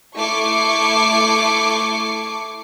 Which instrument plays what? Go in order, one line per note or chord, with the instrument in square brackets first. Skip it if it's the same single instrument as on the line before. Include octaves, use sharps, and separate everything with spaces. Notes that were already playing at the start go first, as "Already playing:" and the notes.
[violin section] A3 E4 C#6 D6 C7